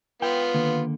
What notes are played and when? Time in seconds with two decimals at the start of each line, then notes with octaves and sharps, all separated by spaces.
0.22 B3 F4 G5
0.54 D3 D#3 A#3